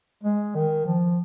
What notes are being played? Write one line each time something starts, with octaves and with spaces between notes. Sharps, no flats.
G#3
D#3
F3